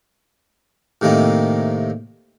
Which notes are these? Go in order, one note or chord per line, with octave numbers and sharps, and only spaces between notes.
A2 C3 D#3 A#3 C4